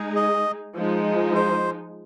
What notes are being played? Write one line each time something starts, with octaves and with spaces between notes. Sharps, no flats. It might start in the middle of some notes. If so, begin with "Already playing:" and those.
Already playing: G#3 D#4 G#4
D#5
F3 G#3 D#4
C5